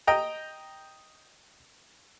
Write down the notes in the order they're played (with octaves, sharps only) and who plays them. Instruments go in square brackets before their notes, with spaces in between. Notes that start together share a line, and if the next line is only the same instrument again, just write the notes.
[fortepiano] D#5 G5 A#5